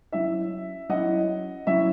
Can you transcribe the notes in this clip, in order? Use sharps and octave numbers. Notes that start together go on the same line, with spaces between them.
F#3 C#4 E4 E5
F#3 C#4 E4 D#5 F#5
F#3 C#4 E4 E5